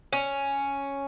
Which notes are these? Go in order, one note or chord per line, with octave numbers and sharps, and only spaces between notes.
C#4